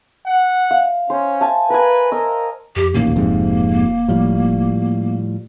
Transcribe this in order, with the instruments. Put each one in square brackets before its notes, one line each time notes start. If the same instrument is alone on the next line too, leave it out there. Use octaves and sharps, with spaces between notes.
[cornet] F#5
[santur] F5
[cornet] C#4 [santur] C5
[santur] G#5 A5
[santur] A#4 G#5 [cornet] B4
[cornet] A#4 [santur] D#5 E6
[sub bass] F2 [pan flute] G4
[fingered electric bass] D1 A1 D#2 [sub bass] A#2 [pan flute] A#3
[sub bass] E1 [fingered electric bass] F2 G#2 C3
[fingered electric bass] A2 F3 G3